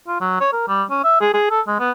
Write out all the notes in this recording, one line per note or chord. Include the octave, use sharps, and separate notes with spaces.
F4
F#3
C#5
A#4
G3
C#4
E5
G#4
G#4
A4
G#3
B3